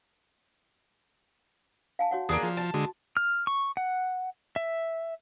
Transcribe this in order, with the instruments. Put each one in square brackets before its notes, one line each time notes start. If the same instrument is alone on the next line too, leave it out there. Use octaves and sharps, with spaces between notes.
[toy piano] F5 G#5 A5
F#4 C#5 F#5
[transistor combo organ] E2 [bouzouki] A#3 D4 G#4
[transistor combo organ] F3
[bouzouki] A5
[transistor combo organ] D3 G#3 [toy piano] F#4
[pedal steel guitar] F6
C#6
F#5
E5